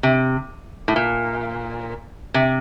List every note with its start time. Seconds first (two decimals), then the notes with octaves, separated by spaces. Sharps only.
0.03 C3
0.88 A2
0.96 A#2
2.34 C3